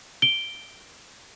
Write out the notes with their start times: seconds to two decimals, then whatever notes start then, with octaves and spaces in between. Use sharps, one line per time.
0.22 D7 G7